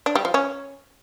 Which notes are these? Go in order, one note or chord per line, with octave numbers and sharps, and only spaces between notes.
D4
G3
F3
C#4